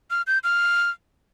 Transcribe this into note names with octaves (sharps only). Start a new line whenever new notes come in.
F6
G6
F6